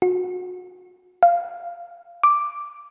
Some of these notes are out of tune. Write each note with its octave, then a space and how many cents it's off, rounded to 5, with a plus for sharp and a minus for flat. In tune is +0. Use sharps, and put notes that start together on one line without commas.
F#4 -35
F5 -15
D6 +0